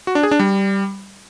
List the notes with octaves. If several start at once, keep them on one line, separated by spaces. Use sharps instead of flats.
F#4
D4
G#4
D4
G3